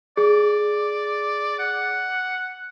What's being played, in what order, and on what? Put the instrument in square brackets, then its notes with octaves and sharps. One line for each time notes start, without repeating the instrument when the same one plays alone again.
[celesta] G#4 [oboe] D5
[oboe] F#5